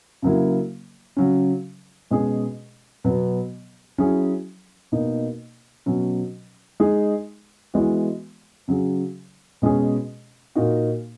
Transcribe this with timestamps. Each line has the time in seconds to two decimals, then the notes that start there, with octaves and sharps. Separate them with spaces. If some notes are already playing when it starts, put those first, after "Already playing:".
0.22 C#3 F#3 A#3 E4
1.17 C#3 F#3 C#4
2.11 B2 G#3 C#4 G#4
3.04 B2 F#3 B3
3.98 F#3 C#4 E4 G#4
4.92 B2 A#3 D#4
5.86 B2 F#3 C#4
6.80 G#3 D#4 G#4
7.74 E3 G#3 B3 F#4
8.68 C#3 F#3 C#4 G#4
9.62 B2 G#3 C#4 G#4
10.55 A#2 A#3 D#4 F#4